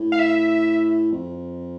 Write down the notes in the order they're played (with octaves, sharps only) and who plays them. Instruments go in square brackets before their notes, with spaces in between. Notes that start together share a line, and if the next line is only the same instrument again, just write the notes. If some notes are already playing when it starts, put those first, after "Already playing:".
Already playing: [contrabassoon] A2
[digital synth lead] F5
E5
[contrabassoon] F2